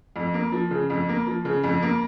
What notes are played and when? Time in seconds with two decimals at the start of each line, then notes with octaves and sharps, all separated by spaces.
0.16 F2
0.34 A#3
0.52 F3
0.71 C#3
0.90 F2
1.09 A#3
1.27 F3
1.45 C#3
1.64 F2
1.83 A#3